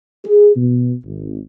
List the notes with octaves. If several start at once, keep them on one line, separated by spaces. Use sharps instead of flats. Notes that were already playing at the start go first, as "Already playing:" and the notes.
G#4
B2
G#1